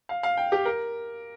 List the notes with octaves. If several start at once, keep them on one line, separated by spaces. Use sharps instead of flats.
F5
F5
G5
G4
A#4